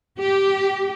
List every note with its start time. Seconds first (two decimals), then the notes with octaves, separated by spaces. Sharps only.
0.20 G4